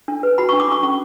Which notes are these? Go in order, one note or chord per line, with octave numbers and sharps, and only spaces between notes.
D4
B4
F#4 B5
D4 C#6
D6
D4 C#6
C#4 C#6